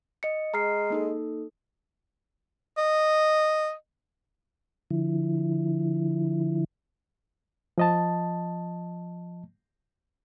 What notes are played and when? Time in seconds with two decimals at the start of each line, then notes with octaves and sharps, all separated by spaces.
0.23 D#5 C#7
0.54 G#3 A#5 F6 C7
0.90 A#3 D#4 A4
2.77 D#5
4.91 D3 F3 E4
7.78 F3 D#5 A5